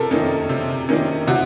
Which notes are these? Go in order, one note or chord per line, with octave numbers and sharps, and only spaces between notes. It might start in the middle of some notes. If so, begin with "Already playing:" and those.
Already playing: C3 A4 A#4
D#3 A#3 C#4
C3
D#3 A#3 C#4
C3 F#4